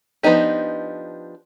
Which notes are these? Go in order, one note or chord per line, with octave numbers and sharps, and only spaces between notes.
F3 B3 D4 D#4 G4